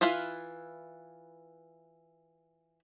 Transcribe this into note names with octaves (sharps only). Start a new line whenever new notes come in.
E3 E4 F4 B4 F5